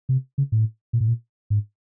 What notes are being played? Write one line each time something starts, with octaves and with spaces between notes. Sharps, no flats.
C3
C#3
A2
A#2
A2
A#2
G#2